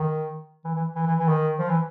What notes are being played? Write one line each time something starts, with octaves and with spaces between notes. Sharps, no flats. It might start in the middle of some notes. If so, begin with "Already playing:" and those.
Already playing: D#3
E3
E3
E3
E3
E3
D#3
F3
E3